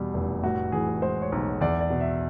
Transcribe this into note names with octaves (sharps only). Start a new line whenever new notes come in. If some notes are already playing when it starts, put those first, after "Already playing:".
Already playing: E2 B2 G3
F1
A2 F#4
E3 G#4
G#3 C5
C#5
B1
E2 D5
D5
B2
E5